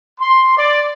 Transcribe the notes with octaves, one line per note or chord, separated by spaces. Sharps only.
C6
D5